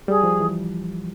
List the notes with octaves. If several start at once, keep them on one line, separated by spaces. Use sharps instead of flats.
G3 G#4
F3
E3